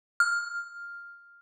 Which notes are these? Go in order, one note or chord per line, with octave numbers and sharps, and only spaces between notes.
F6